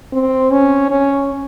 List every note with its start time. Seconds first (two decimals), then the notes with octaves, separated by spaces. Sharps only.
0.13 C4
0.51 C#4
0.90 C#4